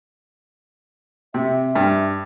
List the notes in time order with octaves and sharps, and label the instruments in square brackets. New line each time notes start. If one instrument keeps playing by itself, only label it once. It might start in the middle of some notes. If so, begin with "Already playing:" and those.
[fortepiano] C3 [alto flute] E5
[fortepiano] G2